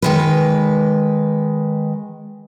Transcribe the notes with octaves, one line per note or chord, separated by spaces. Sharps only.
D#3 G#3 B4